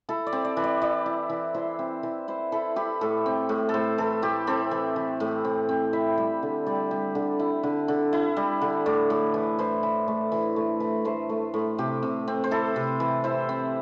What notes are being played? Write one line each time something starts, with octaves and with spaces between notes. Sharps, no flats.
E4 A4
D5
C4
D5
E3
D5
E4 D5
E4
E3
E4 C5
C4
E3
E4 C5
E4 A4
E4 G4
A2 A4
C4
A2
A4
A2 C5
E3 A4
A2 G4
C4 A4
E3
E3
A2
C4
C4
E4 E5
G3
D3
G3 D5
G3
D3
E4
D3
D3
E4
G3
D3
A2 D5
A2
E3
E3 C5
E3
A3
E3
A3
E3
A3 C5
A3
A2
C3 G4
C3
C4
C5
E4 A4
C3
E3
E4 C5
C4